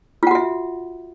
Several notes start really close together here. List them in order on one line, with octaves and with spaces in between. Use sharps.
F4 F#5 F#4 E5